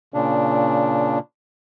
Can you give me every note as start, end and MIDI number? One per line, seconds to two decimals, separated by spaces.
0.14 1.19 46
0.14 1.19 49
0.14 1.19 62